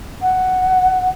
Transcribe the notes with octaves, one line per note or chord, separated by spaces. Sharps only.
F#5